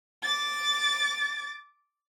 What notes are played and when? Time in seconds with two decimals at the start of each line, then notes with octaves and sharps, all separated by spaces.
0.23 D6 A6